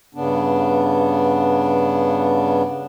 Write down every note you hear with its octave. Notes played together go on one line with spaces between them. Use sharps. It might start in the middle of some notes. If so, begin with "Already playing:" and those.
G2 C#3 B3 D4